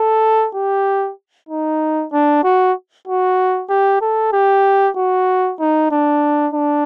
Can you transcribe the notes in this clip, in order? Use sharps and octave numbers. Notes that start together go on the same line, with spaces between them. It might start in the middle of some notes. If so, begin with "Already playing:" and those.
Already playing: A4
G4
D#4
D4
F#4
F#4
G4
A4
G4
F#4
D#4
D4
D4